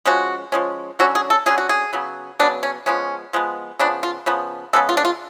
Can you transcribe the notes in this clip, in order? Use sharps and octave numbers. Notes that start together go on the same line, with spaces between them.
F3 G#3 C#4 F#4
F3 G#3 C#4
D3 F#3 C#4 F#4
G#4
A4
D3 F#3 C#4 G#4
F#4
G#4
C#3 F#3 B3
C#3 F#3 B3 D4
C#4
F3 G#3 B3 C#4
F3 G#3 B3
C#3 F3 B3 D4
F4
C#3 F3 B3
C#3 G#3 B3 A4
F4
D4
F4